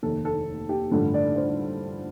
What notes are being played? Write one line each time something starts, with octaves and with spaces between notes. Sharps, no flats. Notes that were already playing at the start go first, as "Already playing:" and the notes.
F1 D#2 D#3 A4
A4
G4
A1 G2 D3 F3 A4
D5
C5